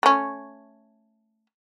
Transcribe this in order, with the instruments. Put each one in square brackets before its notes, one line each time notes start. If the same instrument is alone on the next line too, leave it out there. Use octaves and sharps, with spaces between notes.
[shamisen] A3 C#4